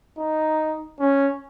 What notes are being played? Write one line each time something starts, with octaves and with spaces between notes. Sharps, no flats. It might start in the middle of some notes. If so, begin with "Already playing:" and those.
D#4
C#4